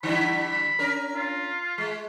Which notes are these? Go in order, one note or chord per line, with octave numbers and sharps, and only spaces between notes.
D3 G3 E4 B5
B5
C#4 A#4
F4
G#3